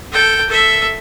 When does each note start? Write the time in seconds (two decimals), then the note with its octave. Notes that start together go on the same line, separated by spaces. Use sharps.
0.12 A4 G5
0.49 A4 E5